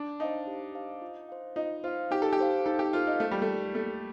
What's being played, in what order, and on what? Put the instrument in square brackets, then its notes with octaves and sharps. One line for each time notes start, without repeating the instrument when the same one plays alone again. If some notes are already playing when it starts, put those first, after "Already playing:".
Already playing: [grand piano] D4
[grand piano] D#4 [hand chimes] C5 F5 A5
[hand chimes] G4
C5 F5 A5
F4
C5 F5
[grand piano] D#4 [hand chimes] F4
[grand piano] F4 [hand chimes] C5 F5
[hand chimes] D#4 [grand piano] G4
[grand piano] A4
G4
[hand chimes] A4 C5 F5
[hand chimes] D#4 [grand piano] A4
[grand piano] G4
[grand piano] F4 [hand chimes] A4 C5 F5
[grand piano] D#4
[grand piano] A3 [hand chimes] A#3
[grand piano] G3
A3
[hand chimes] D#4 A#4
[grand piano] A3 [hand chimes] A#3